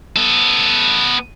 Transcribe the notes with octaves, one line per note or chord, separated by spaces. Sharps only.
B3 A4